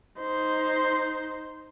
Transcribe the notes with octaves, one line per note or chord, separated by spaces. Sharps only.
D#4 C5